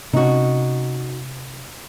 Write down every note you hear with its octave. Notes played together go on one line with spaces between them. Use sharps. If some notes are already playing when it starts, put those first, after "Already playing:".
C3 C#4 D#4 F#4